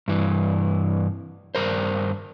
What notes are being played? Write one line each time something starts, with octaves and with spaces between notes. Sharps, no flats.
G2 E3
G2 A#4 C5